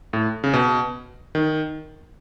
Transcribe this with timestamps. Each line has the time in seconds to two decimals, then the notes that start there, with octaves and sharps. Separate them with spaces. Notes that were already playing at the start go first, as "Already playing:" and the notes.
0.13 A2
0.44 C#3
0.53 B2
1.35 D#3